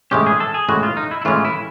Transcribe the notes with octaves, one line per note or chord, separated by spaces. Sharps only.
A2 E3 G#3 C#4 G4
G#4
A4
G#4
A2 E3 G#3 C#4 F#4
F4
D#4
E4
E4
A2 E3 G#3 C#4 F4
E4